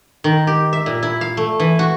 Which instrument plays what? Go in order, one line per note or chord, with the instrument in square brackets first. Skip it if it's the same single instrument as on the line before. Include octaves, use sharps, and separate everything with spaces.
[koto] D#3
G4
E5
A#2
E4
F5
A3
E3
F#4